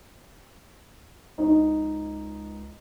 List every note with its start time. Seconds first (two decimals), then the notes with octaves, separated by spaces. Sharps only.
1.38 C#2 D#4